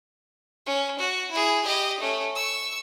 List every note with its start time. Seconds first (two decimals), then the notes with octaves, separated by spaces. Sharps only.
0.66 C#4
0.99 F#4
1.31 E4 G#4
1.64 G4 D#5
2.00 A3 C#4
2.35 C#6 E6